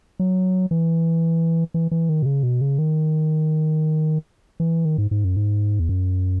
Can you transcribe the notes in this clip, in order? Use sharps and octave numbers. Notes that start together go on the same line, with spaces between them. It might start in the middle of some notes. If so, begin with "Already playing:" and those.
F#3
E3
E3
E3
D#3
B2
C#3
B2
C#3
D#3
E3
D#3
G#2
G#2
F#2
G#2
E2
F#2